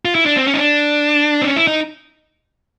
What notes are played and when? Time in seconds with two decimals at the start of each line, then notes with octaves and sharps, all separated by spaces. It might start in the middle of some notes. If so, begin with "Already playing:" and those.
0.05 F4
0.15 E4
0.26 D4
0.37 C4
0.48 C#4
0.54 D#4
0.59 D4
1.42 C4
1.46 C#4
1.56 E4
1.67 D#4